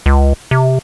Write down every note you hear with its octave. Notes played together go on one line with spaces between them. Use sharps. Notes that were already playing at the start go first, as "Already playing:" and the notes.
C#2
C3